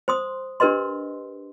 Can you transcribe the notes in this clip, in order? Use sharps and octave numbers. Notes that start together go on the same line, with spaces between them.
C5 C6 D#6
D4 G4 A#4 B4 D#5 C6